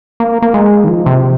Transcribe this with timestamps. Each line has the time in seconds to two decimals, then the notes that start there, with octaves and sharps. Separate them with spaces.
0.20 A#3
0.42 A#3
0.54 G#3
0.84 D#3
0.88 F3
1.06 C3